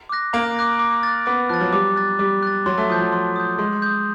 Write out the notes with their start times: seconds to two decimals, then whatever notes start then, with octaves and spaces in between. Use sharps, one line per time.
0.09 D6 F#6 A#6
0.33 A#3 A#5
0.57 D6 F#6 A#6
0.79 D6
1.03 F#6 A6
1.26 B3 D6
1.49 F3 F#6
1.54 A6
1.61 F#3
1.72 G3 D6
1.96 F#6 A6
2.19 G3 D6
2.43 F#6 A6
2.66 F#3 C6
2.78 A3
2.89 F3 D#6 G6
3.01 F#3
3.12 C6
3.36 D#6 G6
3.58 G#3 C6
3.82 D#6 G6